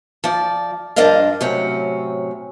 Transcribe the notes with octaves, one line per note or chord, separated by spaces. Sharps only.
F3 D5
G2 F3 D4 A#4 D#5 F5
A2 C3 F#3 C4 C#4